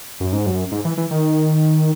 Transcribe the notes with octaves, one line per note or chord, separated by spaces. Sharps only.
F#2
G#2
F#2
G#2
E3
E3
D#3